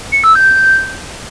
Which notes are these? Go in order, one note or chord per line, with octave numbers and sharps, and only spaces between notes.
C#7
E6
G6